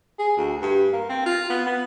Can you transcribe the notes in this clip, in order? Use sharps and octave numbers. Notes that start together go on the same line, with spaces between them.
G#4
D2
G2
A#3
C4
F4
B3
B3